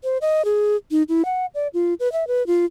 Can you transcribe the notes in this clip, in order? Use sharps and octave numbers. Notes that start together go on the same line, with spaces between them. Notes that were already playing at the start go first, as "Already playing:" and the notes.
C5
D#5
G#4
D#4
E4
F#5
D5
F4
B4
E5
B4
F4